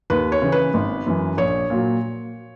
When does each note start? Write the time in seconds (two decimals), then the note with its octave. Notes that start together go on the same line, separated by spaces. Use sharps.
0.10 D#2 B4
0.32 C#5
0.42 C#3 E3
0.52 B4
0.74 G#1
1.07 F#2 E3
1.37 A#1 C#5
1.70 A#2 F#3